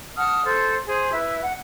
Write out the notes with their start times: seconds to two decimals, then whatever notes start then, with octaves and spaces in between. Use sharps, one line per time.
0.16 F#5 A5 D#6 F6
0.44 A4 C5
0.86 G#4 C5 G#5
1.12 E4 B4 E5
1.42 F#5